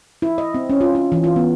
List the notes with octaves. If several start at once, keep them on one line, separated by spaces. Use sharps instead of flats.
E4
D#5
C4
C#4
F4
F4
E3
F4
B3